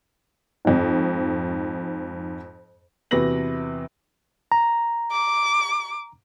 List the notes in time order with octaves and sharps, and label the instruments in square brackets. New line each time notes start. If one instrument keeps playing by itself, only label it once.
[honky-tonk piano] F2 G#2
[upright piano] E2 C3 F#4 B4 A#6 F#7
[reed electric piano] A#5
[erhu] D6